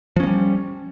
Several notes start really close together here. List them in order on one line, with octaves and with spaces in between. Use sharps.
F3 C#4 A#3 G3